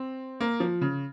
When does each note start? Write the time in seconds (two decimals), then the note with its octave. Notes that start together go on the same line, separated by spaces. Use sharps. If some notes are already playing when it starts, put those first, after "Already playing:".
Already playing: C4
0.40 A#3
0.60 F3
0.81 C#3